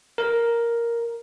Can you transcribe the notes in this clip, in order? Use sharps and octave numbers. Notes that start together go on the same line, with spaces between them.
A#4